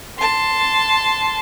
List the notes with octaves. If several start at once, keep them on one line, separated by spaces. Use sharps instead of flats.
A5 C6